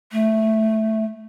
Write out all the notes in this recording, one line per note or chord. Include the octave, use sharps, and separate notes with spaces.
A3